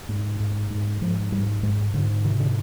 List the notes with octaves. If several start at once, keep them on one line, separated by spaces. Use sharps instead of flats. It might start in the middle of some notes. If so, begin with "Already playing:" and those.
G#2
G#2
G#2
G#2 F3
G#2 G3
G#2 G#3
G#2 D3
C3 D#3
D3